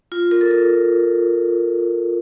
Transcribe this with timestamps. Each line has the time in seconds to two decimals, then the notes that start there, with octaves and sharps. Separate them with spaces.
0.12 F4
0.31 A#4
0.41 A4
0.51 A4